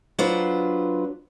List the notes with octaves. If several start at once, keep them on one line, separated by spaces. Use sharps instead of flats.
F#3 D4 F4 B4 C5